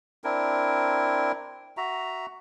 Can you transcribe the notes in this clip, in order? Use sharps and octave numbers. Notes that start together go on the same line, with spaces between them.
C4 D4 E4 A#4
F#4 E5 A#5